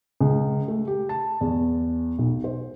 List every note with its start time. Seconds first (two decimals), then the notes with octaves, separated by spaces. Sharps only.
0.21 C#2
0.68 A3
0.87 G4
1.09 A5
1.41 E2
2.18 B1
2.44 C5